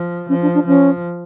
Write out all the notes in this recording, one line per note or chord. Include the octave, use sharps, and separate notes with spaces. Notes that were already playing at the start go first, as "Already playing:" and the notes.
Already playing: F3
F3 C#4
D4
D4
F3 C#4